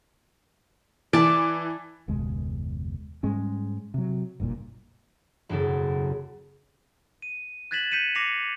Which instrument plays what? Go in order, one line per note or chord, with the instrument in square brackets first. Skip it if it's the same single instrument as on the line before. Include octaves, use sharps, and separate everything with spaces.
[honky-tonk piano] E3 [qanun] D5 A5
[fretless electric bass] F#1 D#2 B2 G#3
G#2 G3 G#3 C#4
C3 F#3
F#1 B1 G2 A#2
[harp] E1 F#2 C#3 A4
[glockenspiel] D#7
F#6 G#6 A6 B6 E7 F#7
G6 B6 C#7 D#7 E7
D6 A#6 C7 C#7 F7